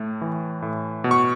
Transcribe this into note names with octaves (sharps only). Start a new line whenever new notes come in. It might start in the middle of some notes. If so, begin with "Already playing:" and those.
Already playing: A2 A3
E3
A2
B2
C#6